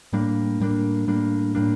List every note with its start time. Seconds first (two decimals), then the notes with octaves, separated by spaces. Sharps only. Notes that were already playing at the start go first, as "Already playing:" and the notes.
0.13 A2 G3 A#3 D4
0.60 A2 G3 A#3 D4
1.07 A2 G3 A#3 D4
1.55 A2 G3 A#3 D4